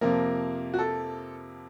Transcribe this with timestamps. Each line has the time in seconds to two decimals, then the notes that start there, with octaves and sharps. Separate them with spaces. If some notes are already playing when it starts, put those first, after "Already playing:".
0.01 F2 C3 F3 A#3 A#4
0.74 F#4
0.79 A4